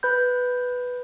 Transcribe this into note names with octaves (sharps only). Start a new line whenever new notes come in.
B4 B5 G6